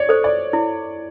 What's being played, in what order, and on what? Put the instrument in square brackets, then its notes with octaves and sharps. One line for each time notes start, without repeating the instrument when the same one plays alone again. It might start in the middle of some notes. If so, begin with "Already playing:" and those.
Already playing: [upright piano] C#5 D5
[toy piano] A4 C5
[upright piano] D5
[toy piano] E4